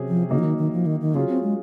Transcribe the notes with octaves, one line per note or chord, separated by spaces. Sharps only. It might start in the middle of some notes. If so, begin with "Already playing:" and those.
Already playing: C3 F#3 C#4 G#4
F3
C#3 F#3 A#3 D#4
F3
D#3
D#3
F3
D#3
D#3
C#3 F#3 C#4 F4 G#4
C4
G#3